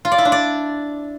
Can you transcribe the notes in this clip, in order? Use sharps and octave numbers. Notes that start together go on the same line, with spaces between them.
F4
D5
E4
D4
D5